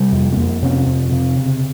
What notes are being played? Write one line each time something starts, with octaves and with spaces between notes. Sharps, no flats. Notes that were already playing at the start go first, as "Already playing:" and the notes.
Already playing: C3 G3
F2
C4
F2 A#3
C3 C#4
F2 C4
C3
C#3